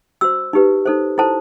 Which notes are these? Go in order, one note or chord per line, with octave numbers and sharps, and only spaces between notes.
F#4 C5 E6
D#4 G4 B4
D#4 A4 C5
E4 A4 C5 A5